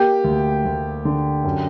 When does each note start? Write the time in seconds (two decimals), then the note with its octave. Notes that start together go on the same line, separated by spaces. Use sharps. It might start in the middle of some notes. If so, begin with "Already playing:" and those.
Already playing: A#3 G4
0.24 D2
0.65 D2
1.05 D3
1.44 F#2